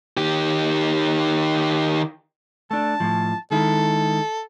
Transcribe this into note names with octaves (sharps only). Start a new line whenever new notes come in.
D#3 G4
A3 D4 A5
A2 F3
D#3 G#3 E4 A4